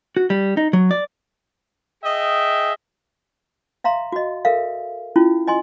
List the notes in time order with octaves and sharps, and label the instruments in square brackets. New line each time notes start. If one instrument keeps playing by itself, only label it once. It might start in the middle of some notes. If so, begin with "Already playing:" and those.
[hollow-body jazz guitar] F#4
G3
D#4
F#3
D5
[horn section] G#4 D#5 E5 G5
[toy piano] E5 F5 A#5 C6
F#4 D#5
A4 A#4 E5 F5
C#4 E4 F4
D#5 G#5 C6